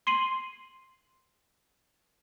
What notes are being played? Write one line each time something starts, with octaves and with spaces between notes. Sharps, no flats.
C6 C7 D#7 F#7